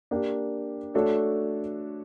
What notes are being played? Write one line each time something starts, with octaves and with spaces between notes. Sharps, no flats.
A#3 D4 G4
A3 D4 F#4 A4 C#5